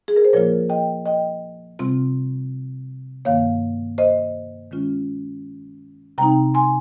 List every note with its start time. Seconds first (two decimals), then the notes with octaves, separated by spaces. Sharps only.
0.08 G#4
0.16 A#4
0.25 C5
0.33 A#2 F3 A#3 F4 A#4 C#5
0.70 D#5 G5
1.06 D#5 G5
1.79 C3 G3 C4 F4
3.25 G2 D#3 A#3 C#5 F5
3.98 C5 D#5
4.71 D#3 G#3 C#4 F4
6.18 C3 G3 C4 D#4 G5 A#5
6.54 G#5 C6